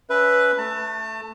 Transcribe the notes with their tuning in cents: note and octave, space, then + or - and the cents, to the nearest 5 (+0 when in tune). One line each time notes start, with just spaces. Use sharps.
C#4 +25 B4 +0 E5 +0
A3 +0 A5 +30